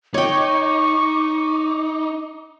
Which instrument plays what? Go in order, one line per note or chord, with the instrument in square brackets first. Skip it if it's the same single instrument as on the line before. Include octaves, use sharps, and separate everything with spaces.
[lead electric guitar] D#4 [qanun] C#5 G5 [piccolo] C#6 [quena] D6